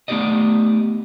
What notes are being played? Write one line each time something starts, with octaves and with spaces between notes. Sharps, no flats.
A3 B3 D#4 G4 D5 D#5